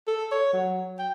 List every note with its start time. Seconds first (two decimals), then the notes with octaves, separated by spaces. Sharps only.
0.07 A4
0.32 C#5
0.53 F#3
0.99 G5